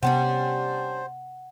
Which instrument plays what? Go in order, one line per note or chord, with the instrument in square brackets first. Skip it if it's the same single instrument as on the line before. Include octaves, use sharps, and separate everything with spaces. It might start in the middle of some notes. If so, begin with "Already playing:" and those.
[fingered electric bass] C3 B3 [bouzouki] G3 C#4 D4 [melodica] C5 [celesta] F#5